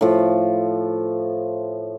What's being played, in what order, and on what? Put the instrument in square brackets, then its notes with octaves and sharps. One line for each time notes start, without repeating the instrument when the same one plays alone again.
[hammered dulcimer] A2 F3